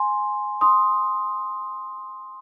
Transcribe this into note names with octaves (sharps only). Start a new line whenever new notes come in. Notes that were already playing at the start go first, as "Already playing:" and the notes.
Already playing: G#5 C6
C6 D#6